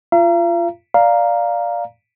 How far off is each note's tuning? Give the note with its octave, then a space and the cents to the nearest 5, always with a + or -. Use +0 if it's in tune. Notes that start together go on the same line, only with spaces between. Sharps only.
F4 -20 F5 -45 A#5 +0
D5 +0 F5 +0 A#5 +0